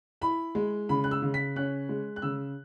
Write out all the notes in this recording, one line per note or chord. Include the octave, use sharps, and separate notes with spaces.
E4 B5
G#3
C#3 B5
F#6
E6
C#3
B6
C#4 F#6
G#3
F#6
C#3 E6